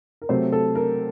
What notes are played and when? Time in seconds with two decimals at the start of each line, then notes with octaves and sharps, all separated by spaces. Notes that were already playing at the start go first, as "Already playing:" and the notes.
0.22 A#4
0.29 C3 F#3 A3 C5
0.52 A4
0.75 A#4